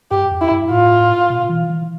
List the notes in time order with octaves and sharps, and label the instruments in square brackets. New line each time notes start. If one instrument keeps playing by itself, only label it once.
[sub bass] G2 [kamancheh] G4
[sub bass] F2
[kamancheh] E4
[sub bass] G2
[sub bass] A2 [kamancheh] F4
[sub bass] B2
E3
E3